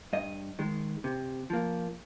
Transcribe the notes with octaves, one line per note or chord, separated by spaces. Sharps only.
G2 D#5
D#3 G#3
C3
F3 A#3